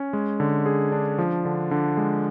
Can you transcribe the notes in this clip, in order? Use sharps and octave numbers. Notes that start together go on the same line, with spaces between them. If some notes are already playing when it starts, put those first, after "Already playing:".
Already playing: C#4
G#3
D3
G#4
D4
F3
D3
D3
G#3